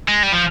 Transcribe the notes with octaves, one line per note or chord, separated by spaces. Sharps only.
G#3
G3
F3